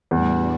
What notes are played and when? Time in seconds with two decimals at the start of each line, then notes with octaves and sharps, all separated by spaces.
0.11 E2 A2 G3 D4 F#4